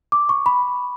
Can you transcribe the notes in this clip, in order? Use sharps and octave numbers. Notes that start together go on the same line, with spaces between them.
D6
C#6
B5